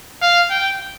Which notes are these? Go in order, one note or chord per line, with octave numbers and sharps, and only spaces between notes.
F5
G5